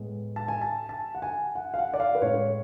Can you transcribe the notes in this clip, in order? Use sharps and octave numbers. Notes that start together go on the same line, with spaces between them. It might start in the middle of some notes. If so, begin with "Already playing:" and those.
Already playing: A2 G#3 B3
A5
G#5
A5
A5
F#5
G#5
F#5
F5
F#5
D5
F5
B4
A2 G#3 C#4 C#5